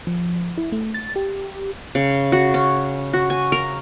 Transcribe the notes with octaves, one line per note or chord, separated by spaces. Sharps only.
F3
E4
A3
A6
G4
C#3
F#4
C#4
F#4
G#5
A#4